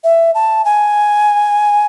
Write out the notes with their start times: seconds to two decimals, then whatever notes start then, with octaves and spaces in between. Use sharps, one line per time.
0.04 E5
0.35 A5
0.65 G#5